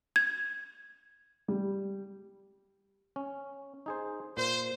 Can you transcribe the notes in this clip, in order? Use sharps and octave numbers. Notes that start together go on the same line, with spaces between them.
G#6
G3
C#4
D#4 G#4 C5
A#2 C5